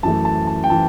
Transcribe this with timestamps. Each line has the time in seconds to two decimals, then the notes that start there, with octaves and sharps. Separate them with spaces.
0.03 F#2 E3 A3 A5
0.25 A5
0.47 A5
0.64 G5
0.70 E3 A5